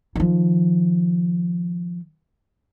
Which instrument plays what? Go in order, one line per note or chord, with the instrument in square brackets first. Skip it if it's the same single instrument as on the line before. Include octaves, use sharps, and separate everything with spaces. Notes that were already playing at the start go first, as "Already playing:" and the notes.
[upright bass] D#3 F3